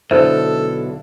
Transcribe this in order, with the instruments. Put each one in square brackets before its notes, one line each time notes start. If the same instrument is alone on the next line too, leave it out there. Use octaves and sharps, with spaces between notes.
[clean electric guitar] B1 [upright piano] D3 E4 [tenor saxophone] A4 [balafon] C5